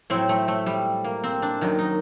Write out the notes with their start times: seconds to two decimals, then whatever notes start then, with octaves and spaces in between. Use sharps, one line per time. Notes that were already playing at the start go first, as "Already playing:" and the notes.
0.10 A2 F#3 C4
0.29 A3
0.48 A3
0.66 G3
1.04 A#3
1.24 C4
1.42 D4
1.61 F#2 D#3 F#3
1.79 D#4